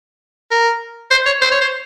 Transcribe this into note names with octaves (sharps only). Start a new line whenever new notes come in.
A#4
C5
C#5
C5
C#5
C5